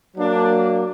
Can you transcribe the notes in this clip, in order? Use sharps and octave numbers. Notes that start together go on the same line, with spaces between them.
F#3 A#3 D4